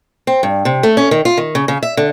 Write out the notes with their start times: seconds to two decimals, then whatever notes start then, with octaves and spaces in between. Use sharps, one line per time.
0.27 C4
0.43 G2
0.65 C3
0.83 A3
0.97 C#4
1.11 D#3
1.25 F4
1.37 D#3
1.55 C#3
1.68 C#3
1.83 E5
1.97 D3